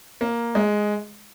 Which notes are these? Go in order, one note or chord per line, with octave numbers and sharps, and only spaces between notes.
A#3
G#3